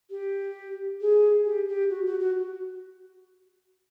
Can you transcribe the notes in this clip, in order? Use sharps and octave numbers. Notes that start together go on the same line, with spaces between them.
G4
G#4
G4
G4
F#4
F#4
F#4